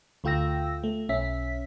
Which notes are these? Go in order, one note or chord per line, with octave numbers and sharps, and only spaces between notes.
D2 A3 F4 G5 E6 A#6
A3
B1 C#4 E5 B6